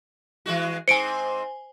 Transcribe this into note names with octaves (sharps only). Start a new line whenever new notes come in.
E3 G#3 F#4
G#2 C4 C5 G#5 C#7 D7